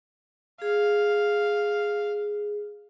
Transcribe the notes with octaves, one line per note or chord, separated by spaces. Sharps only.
G#4 F5